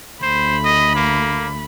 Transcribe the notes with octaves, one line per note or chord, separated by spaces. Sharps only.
D2 C5 B5
D#5
A#3